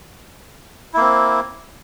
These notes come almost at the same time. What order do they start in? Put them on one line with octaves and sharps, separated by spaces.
E4 A#3 C4